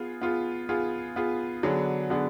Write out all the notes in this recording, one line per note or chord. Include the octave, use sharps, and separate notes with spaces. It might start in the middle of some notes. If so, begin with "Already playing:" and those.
Already playing: B3 F4 G#4
B3 F4 G#4
B3 F4 G#4
B3 F4 G#4
D3 F#3 B3 D4 G#4
D3 F#3 B3 D4 G#4